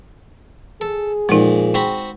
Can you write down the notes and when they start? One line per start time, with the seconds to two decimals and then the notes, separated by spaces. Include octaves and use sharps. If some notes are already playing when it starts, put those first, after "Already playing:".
0.81 G#4 A4
1.29 F2 A#2 G#3 D#4
1.74 C4 F#4 G5 B5